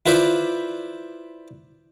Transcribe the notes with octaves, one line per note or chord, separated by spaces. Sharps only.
E4 F4 B4 C5 D5